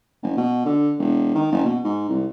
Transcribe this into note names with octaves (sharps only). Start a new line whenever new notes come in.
F#1
B2
D3
E1
D#3
F#1
B2
G#2
C2